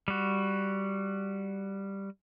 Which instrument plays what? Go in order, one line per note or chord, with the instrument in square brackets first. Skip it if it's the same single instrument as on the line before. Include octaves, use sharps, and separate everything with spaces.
[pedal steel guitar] G3 F#4